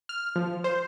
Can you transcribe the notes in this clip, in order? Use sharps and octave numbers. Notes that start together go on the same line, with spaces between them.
F6
F3
C5